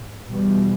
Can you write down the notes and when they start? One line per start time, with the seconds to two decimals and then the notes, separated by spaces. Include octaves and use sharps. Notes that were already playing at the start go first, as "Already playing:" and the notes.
Already playing: G#2
0.29 E2 B2 G3